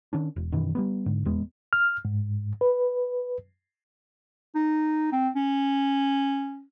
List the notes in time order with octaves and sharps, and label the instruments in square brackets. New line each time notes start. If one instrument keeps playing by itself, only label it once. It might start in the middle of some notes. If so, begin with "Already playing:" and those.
[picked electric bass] D#3 C#4 D4
E1
F#2 B2 D#3 E3
G3 G#3 B3
G#2 D3
D#1 E2 G#3 B3
[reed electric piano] F6
G#2
B4
[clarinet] D#4
C4
C#4